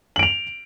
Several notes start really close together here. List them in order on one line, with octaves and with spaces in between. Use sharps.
F#7 D7 F7